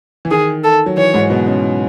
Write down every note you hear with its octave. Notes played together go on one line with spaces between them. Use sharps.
E3
D#3 G#4
A4
F#3
E3 C#5
G#2 G#3
B2 B3
C#3 C#4